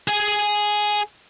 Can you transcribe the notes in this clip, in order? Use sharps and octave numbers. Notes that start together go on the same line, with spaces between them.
G#4 G#5